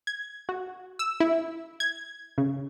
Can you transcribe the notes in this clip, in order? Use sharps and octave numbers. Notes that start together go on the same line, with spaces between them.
G#6
F#4
E6
E4
G#6
C#3